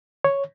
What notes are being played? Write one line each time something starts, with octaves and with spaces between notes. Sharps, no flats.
C#5